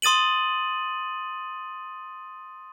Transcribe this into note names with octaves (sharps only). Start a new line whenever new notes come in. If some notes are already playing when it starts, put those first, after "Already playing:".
C6 D#6 A6 D#7 F#7